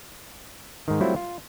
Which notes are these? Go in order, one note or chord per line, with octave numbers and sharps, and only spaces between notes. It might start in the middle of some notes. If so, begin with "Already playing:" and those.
G#2 D#3
F#3 G3 A3 C4 E4 F4
F4